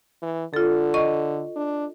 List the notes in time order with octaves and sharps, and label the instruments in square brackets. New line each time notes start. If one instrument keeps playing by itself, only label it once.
[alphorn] E3
[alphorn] D3 [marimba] F4 A4
[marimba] D#5 C#6
[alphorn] D4